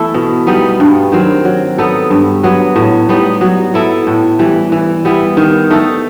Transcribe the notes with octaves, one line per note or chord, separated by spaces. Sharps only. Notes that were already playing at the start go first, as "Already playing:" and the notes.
Already playing: E3 A3 B3 E4 A4
B2
G3 B3 D#4
G2
D#3 F#3 C4
F#3
B3 D#4 A4
G2
F#3 B3
A2
G3 B3 D#4
F#3
B3 E4 A4
A2
E3 G3
E3
G3 B3 E4
D#3
A3 D#4 A4